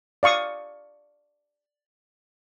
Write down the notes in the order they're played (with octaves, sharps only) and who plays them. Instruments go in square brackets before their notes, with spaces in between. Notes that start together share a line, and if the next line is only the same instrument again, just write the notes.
[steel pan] D5 F5 C#6 D#6